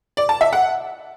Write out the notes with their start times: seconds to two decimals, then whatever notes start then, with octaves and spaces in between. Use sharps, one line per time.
0.17 D5
0.29 A5
0.41 E5
0.53 F#5